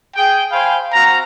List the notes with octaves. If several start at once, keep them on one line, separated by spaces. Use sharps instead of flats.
G#4 G5
C5 F5 G5 G#5 B5
C4 F#4 F5 A#5